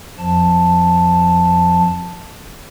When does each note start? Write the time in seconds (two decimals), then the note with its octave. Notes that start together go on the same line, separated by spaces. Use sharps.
0.18 F2 F3 A5